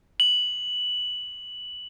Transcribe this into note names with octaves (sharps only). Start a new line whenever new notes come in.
F#7